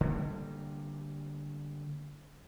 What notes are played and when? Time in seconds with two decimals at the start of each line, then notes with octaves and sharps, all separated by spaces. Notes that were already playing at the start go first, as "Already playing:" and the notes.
0.01 D3 G3 A#3